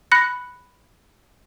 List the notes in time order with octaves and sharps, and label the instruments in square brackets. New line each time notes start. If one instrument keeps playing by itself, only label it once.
[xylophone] B5 F#6 A#6 C#7